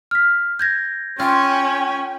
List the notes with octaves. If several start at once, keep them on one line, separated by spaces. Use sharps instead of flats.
F6 B6
G6 G#6 A#6
C#4 F4 A4 G5 G#5